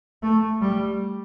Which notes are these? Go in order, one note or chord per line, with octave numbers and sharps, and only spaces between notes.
A3
G3